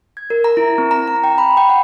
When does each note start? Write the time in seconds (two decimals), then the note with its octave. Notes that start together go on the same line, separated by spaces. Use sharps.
0.17 G#6
0.30 A#4
0.44 A#5
0.57 E4
0.78 C4
0.91 A#5
1.08 A#5
1.24 G5
1.38 B5
1.57 G5
1.69 F#5